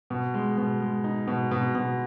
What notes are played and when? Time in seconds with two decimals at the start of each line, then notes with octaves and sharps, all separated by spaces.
0.10 B2
0.34 G#3
0.58 B2
0.81 G#3
1.04 D#4
1.27 B2
1.51 B2
1.75 B2